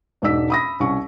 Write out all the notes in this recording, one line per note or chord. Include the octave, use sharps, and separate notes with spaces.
E1 G#2 D5 D#5 E6 B6
B5 D#6 A#6
C2 C#4 C#6